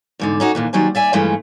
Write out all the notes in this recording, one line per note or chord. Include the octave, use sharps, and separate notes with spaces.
E2 G#2 D3
C#4 D#4 F#4
D#2 A#2 E3
D#3 F#3 G3 C5 G#5
D5 E5 G#5
G2 E3 F3 G#3 A3 C#4